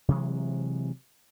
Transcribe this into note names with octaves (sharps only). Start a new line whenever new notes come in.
C3 E3 F#3 G#3